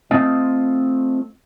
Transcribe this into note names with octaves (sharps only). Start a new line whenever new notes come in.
A3 C4 F4 D#5